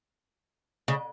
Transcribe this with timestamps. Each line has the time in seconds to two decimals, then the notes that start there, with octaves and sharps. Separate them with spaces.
0.88 C#3